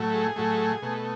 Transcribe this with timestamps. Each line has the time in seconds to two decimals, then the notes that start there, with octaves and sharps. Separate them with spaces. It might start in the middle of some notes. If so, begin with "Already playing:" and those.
Already playing: A2 F#3 A3
0.14 G#4
0.36 A2 F#3 A3
0.82 B2 A3